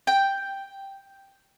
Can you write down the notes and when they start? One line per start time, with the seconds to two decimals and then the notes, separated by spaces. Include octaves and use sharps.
0.07 G5